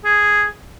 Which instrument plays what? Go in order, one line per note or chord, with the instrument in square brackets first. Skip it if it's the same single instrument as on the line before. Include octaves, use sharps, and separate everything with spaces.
[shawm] G#4